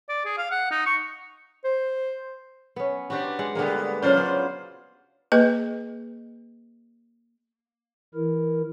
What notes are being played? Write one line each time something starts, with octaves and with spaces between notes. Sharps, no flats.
D5
G#4
F5
F#5
D#4
C#6
C5
B3 C#4
B3 D4 F#4 G4 C5
G#3 F#5
D3 G3 G#3 A#3 B3
C#3 F#3 C#4 D4 F4 C5
B3
A#3 G#4 B4 D#5
E3 E4 A#4